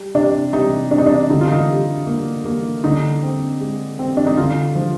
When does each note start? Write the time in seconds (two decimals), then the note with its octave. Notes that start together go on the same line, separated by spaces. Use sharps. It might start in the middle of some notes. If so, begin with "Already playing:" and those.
Already playing: G3
0.15 C3 D4
0.53 C3 D#4
0.91 C4 D4
0.98 D#4
1.06 D4
1.30 D3 D#4
1.41 F4
1.52 D#4
1.69 G3
2.06 A#3
2.45 A#3
2.84 D3 D#4
3.23 C4
3.60 G#3
3.99 C4
4.17 D4
4.27 D#4
4.37 D3 F4
4.75 F3